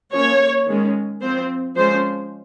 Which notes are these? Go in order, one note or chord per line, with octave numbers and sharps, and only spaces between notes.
F3 A#3 C#4 C#5
D#3 G#3 C#4
F3 C4 C5
F3 G#3 C#4 C5